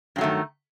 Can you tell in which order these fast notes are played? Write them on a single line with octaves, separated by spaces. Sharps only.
G2 F#3 A3 D#3